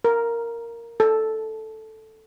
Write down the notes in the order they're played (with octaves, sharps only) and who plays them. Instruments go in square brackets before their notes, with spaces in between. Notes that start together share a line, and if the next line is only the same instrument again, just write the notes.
[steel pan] A#4
A4